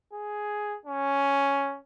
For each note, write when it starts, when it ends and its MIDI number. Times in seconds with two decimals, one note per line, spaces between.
0.13 0.78 68
0.86 1.79 61